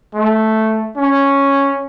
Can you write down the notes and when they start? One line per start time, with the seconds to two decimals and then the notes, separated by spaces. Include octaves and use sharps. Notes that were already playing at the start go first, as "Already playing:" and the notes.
0.15 A3
0.97 C#4